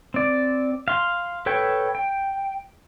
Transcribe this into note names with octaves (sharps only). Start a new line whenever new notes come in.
C4 D5
F5 C6
A4 B4 C#5 G5
G5